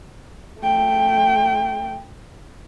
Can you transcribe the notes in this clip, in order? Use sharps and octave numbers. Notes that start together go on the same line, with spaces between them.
A3 G5